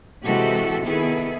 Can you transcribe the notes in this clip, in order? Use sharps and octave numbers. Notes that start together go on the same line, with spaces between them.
C3 E3 G#3 F#4 G4 A4
D#3 B3 E4 G#4 A4